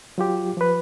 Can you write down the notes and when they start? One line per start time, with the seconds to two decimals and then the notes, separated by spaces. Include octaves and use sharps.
0.18 F#3 F4 G4
0.57 F3 B4